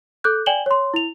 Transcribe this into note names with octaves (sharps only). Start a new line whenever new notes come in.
A4 D6 F#6 G6
D5 G5 G#5 E7 F#7 G7
C#5 C6
E4 F7